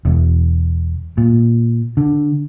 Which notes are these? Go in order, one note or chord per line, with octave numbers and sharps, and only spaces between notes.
E1
A#2
D3